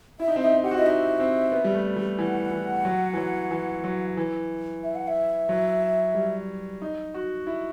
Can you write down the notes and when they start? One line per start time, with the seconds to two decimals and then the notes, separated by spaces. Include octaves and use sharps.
0.20 E4 E5
0.28 D#4
0.36 C4
0.42 D#4 E5
0.53 C4
0.64 G4 F#5
0.71 F#4
0.76 E4 D#5
0.86 D#4 E5
1.20 C4
1.52 B3
1.64 G3
1.74 A3
1.97 G3
2.19 E3 F#5
2.52 E3
2.85 F#3
3.14 E3
3.17 F#3
3.51 E3
3.84 F#3
4.17 E3
4.83 E5
4.95 F#5
5.08 E5
5.49 F#3
6.15 G3
6.82 D#4
7.14 F#4
7.47 E4